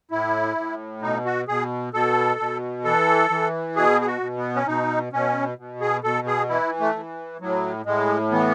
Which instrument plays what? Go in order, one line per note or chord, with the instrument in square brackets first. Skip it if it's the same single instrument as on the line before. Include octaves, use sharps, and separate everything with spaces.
[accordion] A2 E4
A2
B2 D#4
F#4
B2 G#4
B2 A4
B2
E3 A4
E3
B2 G#4
G#4
F#4
B2
B3
C#4
B2 D#4
B2 C#4
B2
G#4
B2 A4
G#4
E3 E4
A3
E3
A2 F#3
A2 G#3
E3 B3